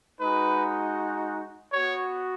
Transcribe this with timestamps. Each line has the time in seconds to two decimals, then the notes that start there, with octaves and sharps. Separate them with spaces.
0.21 G#3 D#4 F#4 B4
1.73 B3 F#4 C#5